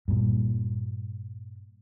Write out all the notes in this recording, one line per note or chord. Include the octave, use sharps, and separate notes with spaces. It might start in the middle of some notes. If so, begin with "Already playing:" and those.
G2 A#2